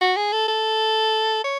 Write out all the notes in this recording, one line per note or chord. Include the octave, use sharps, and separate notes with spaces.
F#4
G#4
A4
A4
C#5